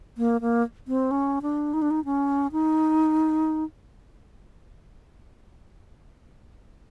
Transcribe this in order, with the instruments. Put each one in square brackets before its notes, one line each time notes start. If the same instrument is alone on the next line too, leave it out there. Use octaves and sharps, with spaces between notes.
[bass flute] A#3
A#3
C4
C#4
D4
D#4
D4
D#4
C#4
D#4